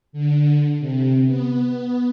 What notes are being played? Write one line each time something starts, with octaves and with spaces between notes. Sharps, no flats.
D3
C3
B3